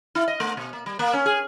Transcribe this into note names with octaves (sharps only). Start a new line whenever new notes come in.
E4
D#5
A3
B2
A#3
G3
A#3
C#4
G#4